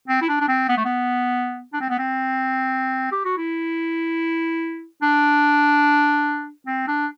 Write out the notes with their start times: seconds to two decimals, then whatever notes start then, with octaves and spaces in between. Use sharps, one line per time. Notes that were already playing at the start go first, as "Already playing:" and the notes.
0.08 C4
0.22 E4
0.29 D4
0.41 D4
0.48 C4
0.69 B3
0.77 A3
0.85 B3
1.73 D4
1.81 C4
1.90 B3
1.99 C4
3.12 G4
3.25 F#4
3.37 E4
5.02 D4
6.67 C4
6.88 D4